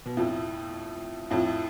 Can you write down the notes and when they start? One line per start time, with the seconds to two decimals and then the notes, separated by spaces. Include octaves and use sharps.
0.06 B2
0.17 F2 A2
1.31 F2 A2